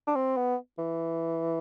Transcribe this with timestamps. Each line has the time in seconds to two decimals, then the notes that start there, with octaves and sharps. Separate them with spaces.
0.07 D4
0.15 C4
0.37 B3
0.78 E3